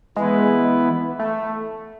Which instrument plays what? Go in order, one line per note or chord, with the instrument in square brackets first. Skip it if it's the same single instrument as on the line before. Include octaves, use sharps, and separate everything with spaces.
[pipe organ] E3 B3 E4 B4 [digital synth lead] G#3
[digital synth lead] A3